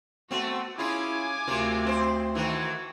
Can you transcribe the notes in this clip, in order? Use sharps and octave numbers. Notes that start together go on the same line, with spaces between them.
A3 B3 C4 F#4
C#4 E4 F4 G#4 G#5 D6
D2 C3 F4 A#4
C4 A4 C5
D#3 E3 A3 F#4